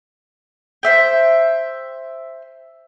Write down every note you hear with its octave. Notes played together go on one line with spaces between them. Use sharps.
C5 E5 G5